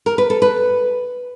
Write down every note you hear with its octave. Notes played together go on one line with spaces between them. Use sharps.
A#4
B4
A4
B4